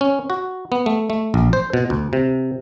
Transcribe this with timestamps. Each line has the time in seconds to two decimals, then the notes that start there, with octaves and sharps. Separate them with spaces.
0.01 C#4
0.30 F#4
0.72 B3
0.86 A3
1.10 A3
1.34 A#1
1.53 C5
1.73 B2
1.90 D2
2.13 C3